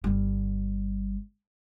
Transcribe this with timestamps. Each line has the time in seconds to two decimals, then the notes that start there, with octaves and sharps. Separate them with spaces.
0.04 G1 G3